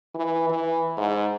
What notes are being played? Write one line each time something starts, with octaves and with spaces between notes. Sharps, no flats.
E3
E3
G#2